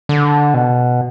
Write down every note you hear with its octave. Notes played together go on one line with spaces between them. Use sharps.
D3
B2